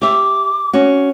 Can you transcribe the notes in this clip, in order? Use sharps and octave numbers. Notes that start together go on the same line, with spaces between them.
G4 E5 D6
C#4 F#4